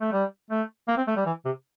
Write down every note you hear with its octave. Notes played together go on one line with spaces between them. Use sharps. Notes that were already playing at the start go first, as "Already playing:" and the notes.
A3
G3
A3
A#3
C4
A3
G3
E3
C3